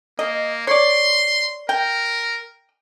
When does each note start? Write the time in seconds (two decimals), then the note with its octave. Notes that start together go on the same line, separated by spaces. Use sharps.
0.19 A#3 D#5
0.67 C#5 D5 C6
1.69 A#4 G5